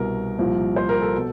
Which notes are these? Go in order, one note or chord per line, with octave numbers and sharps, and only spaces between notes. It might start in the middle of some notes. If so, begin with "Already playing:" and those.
Already playing: C2 B2 A#4
C2 A#2 F3
C5
A#4
A4
B2